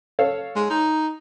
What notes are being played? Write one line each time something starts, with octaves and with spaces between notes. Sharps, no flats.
A4 C#5 F5
G#3
D#4